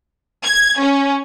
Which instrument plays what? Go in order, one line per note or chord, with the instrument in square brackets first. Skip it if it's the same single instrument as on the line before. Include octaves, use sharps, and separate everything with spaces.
[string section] G#6
C#4